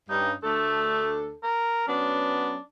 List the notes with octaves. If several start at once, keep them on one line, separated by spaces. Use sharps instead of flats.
G2 C#4 D#4
D2 A3 D4 A4
A#4
F#3 B3 C#4 D4